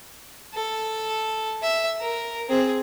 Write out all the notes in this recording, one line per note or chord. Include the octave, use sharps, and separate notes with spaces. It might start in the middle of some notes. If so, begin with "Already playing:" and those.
A4
E5
A#4
C4 G#4